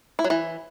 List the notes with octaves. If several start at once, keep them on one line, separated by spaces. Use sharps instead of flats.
E4
F#3
E3